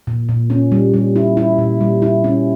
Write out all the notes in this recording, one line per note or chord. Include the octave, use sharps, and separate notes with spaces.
A#2
A#2
C#4
G3
G3
E4
E4
A#2
G3
E4
C#4